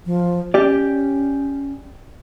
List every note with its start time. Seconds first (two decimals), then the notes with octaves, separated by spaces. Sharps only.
0.06 F3
0.54 C#4 G4 D5